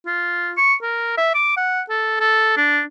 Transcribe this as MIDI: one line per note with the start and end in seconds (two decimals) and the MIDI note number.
0.06 0.52 65
0.57 0.74 85
0.82 1.14 70
1.18 1.30 76
1.34 1.55 86
1.57 1.81 78
1.90 2.18 69
2.21 2.55 69
2.57 2.82 62